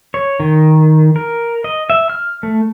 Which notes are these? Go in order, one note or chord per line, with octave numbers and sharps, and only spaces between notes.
C#5
D#3
A#4
D#5
E5
F6
A3